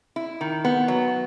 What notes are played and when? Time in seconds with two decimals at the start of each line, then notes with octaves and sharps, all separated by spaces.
0.16 E4
0.41 D#3
0.65 B3
0.88 F#3